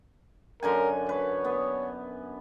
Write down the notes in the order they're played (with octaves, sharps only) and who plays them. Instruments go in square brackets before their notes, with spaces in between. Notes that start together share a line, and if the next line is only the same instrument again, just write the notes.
[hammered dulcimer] F#2 D3 G#5 [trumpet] A#4
[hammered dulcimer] B4 [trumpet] C#5
[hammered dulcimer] B3